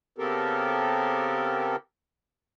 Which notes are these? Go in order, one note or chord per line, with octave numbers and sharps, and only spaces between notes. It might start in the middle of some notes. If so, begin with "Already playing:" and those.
C#3 B3 C4 G4 A4 A#4